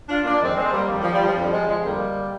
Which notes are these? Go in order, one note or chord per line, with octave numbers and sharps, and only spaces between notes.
D4 F4
A#3 D4
F2 D#3 G#3 C4
G#3 C4
G3 A#3
F2 D#3 G3
F3
G3
F3
F2 D3 G3
F3 G#3
F3 G#3
F2 D3 G3 A#3